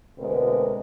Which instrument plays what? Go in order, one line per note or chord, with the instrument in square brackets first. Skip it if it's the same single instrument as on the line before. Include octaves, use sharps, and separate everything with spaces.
[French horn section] D2 B2 G#3 C4 A#4 B4